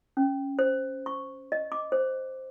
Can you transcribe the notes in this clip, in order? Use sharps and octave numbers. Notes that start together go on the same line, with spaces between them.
C#4
C5
C#6
D#5
D6
C5